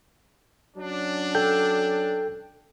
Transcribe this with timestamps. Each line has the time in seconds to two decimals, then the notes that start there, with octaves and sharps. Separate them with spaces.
0.77 F#3 C#4 D4
1.35 A4 G5 G6